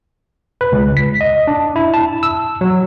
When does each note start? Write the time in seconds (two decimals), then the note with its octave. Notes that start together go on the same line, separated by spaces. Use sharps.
0.61 B4
0.72 C#2
0.97 B6
1.21 D#5
1.47 D4
1.76 E4
1.94 A5
2.23 E6
2.61 F#3